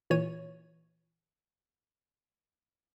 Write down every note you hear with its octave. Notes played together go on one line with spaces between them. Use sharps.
A#2 E3 C#5 D#7